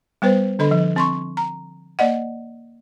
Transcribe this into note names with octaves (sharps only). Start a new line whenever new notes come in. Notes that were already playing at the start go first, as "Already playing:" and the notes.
G3 B3 B4 C5
D3 D4 A4 D#5 B5
F3
C4 C6 C#6
A#5
A#3 D5 D#5 F#5